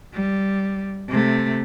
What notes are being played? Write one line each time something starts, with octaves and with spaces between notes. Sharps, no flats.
G3
C3 A3